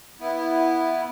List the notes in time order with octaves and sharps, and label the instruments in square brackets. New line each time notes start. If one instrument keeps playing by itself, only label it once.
[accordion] B3 E4